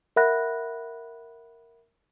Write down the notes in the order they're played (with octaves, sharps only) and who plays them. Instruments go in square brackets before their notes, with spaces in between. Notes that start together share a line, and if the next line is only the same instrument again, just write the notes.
[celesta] A#4 E5 F#5 B5 F#6 A#6